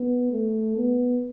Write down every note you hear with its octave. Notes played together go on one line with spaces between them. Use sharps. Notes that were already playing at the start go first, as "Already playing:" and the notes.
Already playing: B3
A3
B3